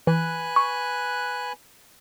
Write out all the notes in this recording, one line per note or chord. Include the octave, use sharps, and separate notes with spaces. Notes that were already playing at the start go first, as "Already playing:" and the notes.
E3 B4 G#5 F#6
C#6